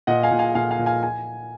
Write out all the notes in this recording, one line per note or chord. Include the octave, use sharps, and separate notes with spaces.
A#2 D#5 F#5
F5 G#5
A#2
F5 G#5
A#2 F5 G#5
F5 G#5
A#2
F5 G#5
G#5